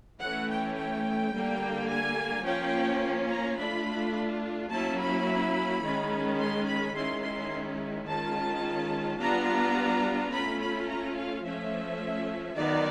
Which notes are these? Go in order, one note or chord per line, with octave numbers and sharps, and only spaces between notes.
E3 A3 C#4 F#5
G5
G5
D3 G3 A#3
G#5
F3 A#3 C#4 F4 G5
A#5
A3 D4 F4 B5
F#3 A#3 C#4 E4 A5
B5
D#3 G#3 C#4
C6
B5
D#3 G#3 C#4 E4 C6
C6
D#3 G#3 C#4 F4 A5
G3 B3 D4 F4 A#5
A3 C#4 F4 B5
B5
A#5
F5
F3 A3 C#4 E5
D#3 F#3 B3 D#4 D5